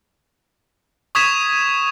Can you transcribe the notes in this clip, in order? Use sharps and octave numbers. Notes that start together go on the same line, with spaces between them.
C#6 D#6 G#6 B6 E7 F7